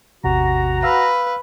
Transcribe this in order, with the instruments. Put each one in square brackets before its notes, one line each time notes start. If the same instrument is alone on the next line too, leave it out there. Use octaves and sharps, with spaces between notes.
[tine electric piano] A1 E2 C3 [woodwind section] F#4 A#5
[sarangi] B4 [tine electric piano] F5 E6 F6